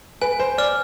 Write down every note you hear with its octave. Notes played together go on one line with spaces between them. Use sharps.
B4 G#5
C5
D5 D6 F6